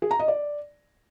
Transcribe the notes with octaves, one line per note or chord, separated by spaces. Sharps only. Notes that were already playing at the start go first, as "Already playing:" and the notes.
G#4
A#5
D#5
D5